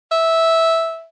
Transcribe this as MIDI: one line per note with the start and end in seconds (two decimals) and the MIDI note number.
0.12 1.06 76